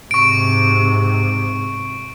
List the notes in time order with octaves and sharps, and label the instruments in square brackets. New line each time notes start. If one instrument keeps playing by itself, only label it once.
[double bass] G#2 C3 [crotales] C#6 D7